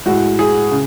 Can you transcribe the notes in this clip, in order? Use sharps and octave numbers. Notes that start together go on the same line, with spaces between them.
A2 G#3 F#4
G#4
C#3